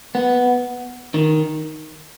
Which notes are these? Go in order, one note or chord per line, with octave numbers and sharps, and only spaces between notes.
B3
D#3